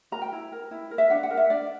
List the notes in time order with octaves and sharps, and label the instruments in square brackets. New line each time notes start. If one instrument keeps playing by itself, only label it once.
[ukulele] F#4 A#4 A#5
G5
E4
A#4
E4
A#4
E5
D4 F#5
F#5
A#4
E5
D4 D5